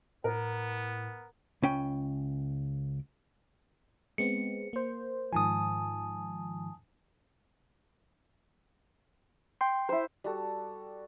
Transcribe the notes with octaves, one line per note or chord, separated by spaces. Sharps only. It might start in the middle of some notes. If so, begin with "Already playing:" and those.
A2 B3 A#4
C#2 C#4 G5
G#3 B3 C4 C#7
A#3 C5
G#2 D#3 F3 G#5 A5 D#6
G5 C6
E4 C5
G3 F#4 A4